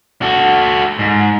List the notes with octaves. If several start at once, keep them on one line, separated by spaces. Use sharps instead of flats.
F#4 A4
G#2